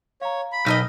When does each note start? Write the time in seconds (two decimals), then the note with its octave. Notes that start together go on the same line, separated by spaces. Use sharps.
0.21 C#5 F5 A#5
0.52 B5
0.66 B1 D#4 A#4 D#5 E6 F6 A#6